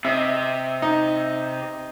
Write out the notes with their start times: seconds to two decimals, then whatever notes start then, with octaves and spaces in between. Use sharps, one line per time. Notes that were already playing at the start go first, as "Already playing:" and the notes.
0.05 C3 D#5 E5
0.82 D#4